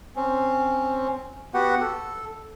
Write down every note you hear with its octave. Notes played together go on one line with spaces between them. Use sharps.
C4 C#4
B3 F#4 G4 F#5
A4